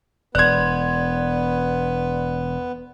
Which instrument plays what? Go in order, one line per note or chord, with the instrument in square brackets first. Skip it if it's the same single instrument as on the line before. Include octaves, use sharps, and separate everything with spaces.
[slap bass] E1 [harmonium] B3 B4 [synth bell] D5 C6 [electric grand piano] F#6 G#6